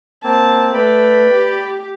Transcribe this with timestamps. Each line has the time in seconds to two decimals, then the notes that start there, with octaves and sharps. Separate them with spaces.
0.24 A#3 C4 A5
0.74 A3 B4 D5 G5 B5
1.30 G4